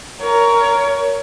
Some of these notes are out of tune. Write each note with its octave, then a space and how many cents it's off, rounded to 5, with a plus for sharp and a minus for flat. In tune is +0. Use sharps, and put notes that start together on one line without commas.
A#4 +0 C#5 +25